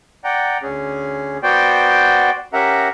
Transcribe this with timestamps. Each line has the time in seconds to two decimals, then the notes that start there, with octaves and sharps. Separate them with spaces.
0.24 D5 F#5 G5 A#5
0.62 D2 C#4 G#4
1.43 B3 F#4 C5 D5 G5
2.53 C#4 G4 A#4 E5 F#5 A#5